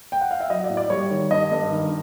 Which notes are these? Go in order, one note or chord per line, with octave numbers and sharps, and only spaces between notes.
G5
F#5
F5
E5
F#3 D#5
D5
A2
D5
G3 C#5
D#3
G2 D#5
G2
D#3